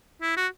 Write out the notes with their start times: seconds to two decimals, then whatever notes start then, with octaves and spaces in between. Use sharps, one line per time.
0.22 E4
0.37 F#4